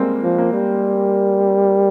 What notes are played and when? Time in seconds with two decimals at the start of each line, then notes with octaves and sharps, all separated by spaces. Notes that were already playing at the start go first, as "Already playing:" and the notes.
Already playing: G3 G#3 A#3 C4
0.23 F3
0.38 A#3
0.53 G3